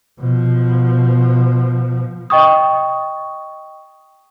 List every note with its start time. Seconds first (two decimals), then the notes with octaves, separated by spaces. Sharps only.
0.20 B2 F3
2.30 D#5 G5 C#6 D#6